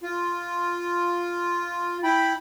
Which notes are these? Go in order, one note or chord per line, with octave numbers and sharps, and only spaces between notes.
F4
E4 G5 B5